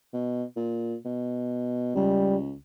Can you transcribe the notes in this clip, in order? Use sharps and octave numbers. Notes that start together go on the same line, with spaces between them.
B2
A#2
B2
C#2 G3